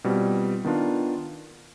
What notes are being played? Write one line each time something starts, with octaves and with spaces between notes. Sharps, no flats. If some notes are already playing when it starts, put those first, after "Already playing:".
B2 G3 C4 F4
D#3 B3 D4 F4